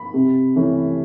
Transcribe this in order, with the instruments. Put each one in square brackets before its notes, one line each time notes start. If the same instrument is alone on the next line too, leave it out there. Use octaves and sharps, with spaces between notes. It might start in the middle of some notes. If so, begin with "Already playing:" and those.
Already playing: [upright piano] B5
C3
E3 A3 C#4